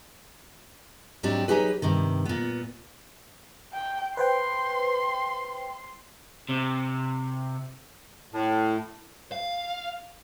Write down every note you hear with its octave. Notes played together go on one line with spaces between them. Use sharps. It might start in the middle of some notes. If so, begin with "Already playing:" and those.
G#2 F#3 C4 D4 G4
F#3 D#4 G4 G#4 B4
G2 C3 D#3
A#2 B3
G5
B4 C5 G5 C6
C3
A2
F5